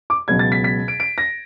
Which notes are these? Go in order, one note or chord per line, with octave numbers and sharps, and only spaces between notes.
D6
C#2 B2 F#3 G#6
A6
B6
B6
D7
D7
A#6